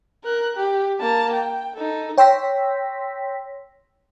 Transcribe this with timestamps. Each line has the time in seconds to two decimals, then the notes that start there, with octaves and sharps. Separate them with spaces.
0.24 A#4 F#6
0.56 G4
1.01 A#3 A5
1.33 G5
1.76 D#4 A4
2.18 C#5 G5 C6 E6 A#6 B6